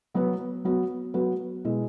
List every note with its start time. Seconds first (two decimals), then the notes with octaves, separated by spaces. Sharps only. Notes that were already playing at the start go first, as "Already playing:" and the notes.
0.14 F#3 B3 F#4 B4
0.65 F#3 B3 F#4 B4
1.14 F#3 B3 F#4 B4
1.64 B2 G#3 E4